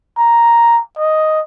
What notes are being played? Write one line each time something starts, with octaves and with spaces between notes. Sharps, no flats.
A#5
D#5